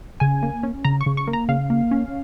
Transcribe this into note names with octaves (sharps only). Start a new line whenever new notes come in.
C#3 G#5
A#3
C#4
C#3 A#5
C#6
C#3
C#6
A#3
A#5
C#3 F5
A#3
C#4